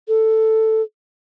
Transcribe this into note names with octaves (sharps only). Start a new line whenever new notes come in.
A4